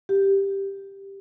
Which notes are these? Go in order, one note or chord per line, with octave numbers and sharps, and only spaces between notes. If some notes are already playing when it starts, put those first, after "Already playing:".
G4